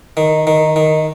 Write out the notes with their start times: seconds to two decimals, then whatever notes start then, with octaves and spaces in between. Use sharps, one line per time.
0.17 D#3
0.47 D#3
0.76 D#3